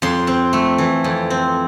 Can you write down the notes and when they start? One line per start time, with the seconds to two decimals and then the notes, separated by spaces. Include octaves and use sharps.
0.02 F2 C6
0.27 C4
0.53 A3
0.78 E3
1.04 F2
1.30 C4